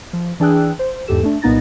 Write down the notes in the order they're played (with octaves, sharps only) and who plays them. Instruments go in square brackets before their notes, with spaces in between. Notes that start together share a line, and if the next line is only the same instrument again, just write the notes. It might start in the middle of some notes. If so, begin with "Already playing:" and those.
[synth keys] F3
E3 D4 G#4 G5 E6 F#6
C5
E2 G#2 G4 A4 E7
A3 D4
C2 A#2 B3 D#4 A6 A#6